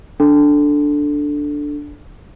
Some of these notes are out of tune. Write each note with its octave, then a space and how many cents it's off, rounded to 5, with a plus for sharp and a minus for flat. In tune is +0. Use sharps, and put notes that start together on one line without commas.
D4 +0 A4 +0